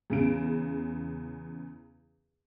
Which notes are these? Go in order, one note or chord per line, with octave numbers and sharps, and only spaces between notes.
E2 C#3 D7